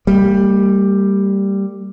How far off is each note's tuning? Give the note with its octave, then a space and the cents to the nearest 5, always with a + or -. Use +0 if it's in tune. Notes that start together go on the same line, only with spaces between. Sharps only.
G3 +0 A#3 -40